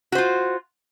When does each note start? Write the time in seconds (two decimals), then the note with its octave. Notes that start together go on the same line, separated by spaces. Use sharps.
0.12 F#4
0.15 C5
0.18 F4